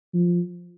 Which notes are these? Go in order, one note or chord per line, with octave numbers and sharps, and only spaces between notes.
F3